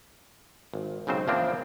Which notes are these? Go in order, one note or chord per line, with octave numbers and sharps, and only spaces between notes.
G#1
B1 G#2 C#3 C4 C5
E2 F3 A#3 C4 D4